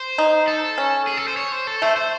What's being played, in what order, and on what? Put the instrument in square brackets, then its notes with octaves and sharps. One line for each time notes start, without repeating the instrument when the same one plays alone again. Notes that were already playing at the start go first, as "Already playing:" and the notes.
Already playing: [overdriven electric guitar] C5
[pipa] D#4
[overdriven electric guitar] A4
[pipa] C#4
[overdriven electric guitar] G#4
A4
C5
C#5
C5
A4
[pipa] A3 [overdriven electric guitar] C5
[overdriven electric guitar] C5